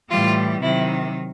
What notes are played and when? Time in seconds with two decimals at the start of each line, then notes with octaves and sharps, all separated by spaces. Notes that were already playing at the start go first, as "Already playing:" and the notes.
0.10 A2 E3 G3 F4
0.62 C3 D#3 F#3 E4